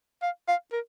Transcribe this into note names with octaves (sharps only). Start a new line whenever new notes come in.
F5
F5
A#4